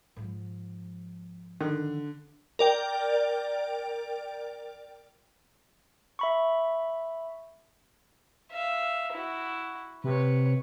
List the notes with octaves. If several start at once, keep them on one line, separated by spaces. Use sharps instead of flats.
G#2 F3
D3 D#3
A#4 D5 G5
E5 B5 C#6
E5 F5
E4 F#4
C3 B4 C#5